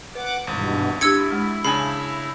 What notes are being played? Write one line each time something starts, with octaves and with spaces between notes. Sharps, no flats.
B4 F#5 D6
G#1 G2 B2 E3
D4 E4 G4 E6 G#6 C#7
G#3 F6
C#3 D4 G#5 B5